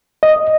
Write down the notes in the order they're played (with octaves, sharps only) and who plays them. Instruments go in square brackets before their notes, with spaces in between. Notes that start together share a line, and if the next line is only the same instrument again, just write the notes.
[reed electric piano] D#5